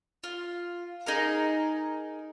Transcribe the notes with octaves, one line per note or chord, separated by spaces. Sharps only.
F4
D#4 G#4 A#4